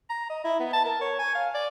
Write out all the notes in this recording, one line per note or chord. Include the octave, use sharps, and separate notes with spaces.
A#5
D#5
E4
B3
A5
A#4
C#5
G#5
F5
D5